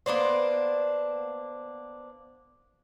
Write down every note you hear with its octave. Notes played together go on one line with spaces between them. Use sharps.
A#3 B3 D4 C5